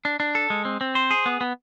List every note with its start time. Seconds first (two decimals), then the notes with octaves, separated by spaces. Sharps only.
0.05 D4
0.20 D4
0.35 A4
0.50 G#3
0.65 C4
0.81 C4
0.95 C5
1.11 G#4
1.26 B3
1.41 B3